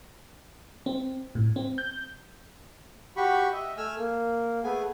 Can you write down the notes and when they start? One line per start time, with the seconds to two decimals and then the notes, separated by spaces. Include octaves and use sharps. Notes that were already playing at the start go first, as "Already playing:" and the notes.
0.86 C4
1.35 A2
1.56 C4
1.78 G6
3.17 F#4 G4 B5 C#6
3.53 D#5 E5
3.77 A3 G#5 E6 F6
3.98 A#3
4.64 A3 B3 G#4 G#5